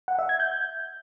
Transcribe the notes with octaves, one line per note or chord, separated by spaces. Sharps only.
F#5
E5
G#6
G6